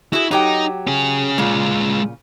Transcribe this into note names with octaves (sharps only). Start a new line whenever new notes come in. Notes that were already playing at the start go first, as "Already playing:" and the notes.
E4 F#4 G#4
F#3 D#4 G4 G5
C#4 G#4
A#2 C#3 G#3 F4